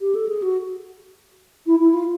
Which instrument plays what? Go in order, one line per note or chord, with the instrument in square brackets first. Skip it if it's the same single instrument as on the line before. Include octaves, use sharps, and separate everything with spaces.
[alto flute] G4
A4
G#4
F#4
E4
E4
F4